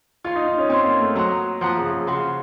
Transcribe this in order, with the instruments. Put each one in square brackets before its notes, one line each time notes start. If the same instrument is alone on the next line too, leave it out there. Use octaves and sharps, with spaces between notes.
[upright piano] F4 [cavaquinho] C#5 F5 C6
[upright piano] D#4
D#4
C#4
[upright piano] C4 [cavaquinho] C#5 F5 C6
[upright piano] A#3
A3
[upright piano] F#3 [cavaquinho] C5 F#5 A#5 D#6
[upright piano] F3 [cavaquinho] C5 F#5 A#5 D#6
[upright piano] C#3
C#3
[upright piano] C#3 [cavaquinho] F#4 C5 F5